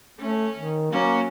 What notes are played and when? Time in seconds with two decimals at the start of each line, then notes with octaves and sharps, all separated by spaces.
0.19 A3 C#4
0.55 D#3
0.91 F#3 A#3 C#4